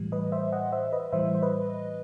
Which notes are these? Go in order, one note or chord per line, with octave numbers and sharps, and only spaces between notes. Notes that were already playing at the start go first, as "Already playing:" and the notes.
Already playing: A2 E3 G3
B4 D#5
C5 E5
D#5 F#5
C5 E5
B4 D#5
A2 E3 G3 C5 E5
C5
B4 D#5